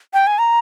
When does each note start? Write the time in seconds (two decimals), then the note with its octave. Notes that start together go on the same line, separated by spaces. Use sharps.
0.14 G5
0.27 G#5
0.39 A#5